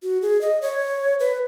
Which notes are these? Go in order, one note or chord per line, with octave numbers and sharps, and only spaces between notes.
F#4
G#4
D#5
C#5
B4